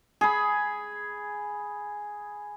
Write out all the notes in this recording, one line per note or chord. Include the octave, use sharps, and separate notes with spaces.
G#4 B5